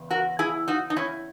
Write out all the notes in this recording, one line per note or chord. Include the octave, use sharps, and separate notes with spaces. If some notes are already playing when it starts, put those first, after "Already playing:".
Already playing: E2 C#3
F#4 A#4
E4 G#4
D#4 F#4
D#4
C#4 E4